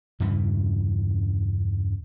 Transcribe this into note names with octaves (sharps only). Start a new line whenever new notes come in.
E2 G2 C#3 E3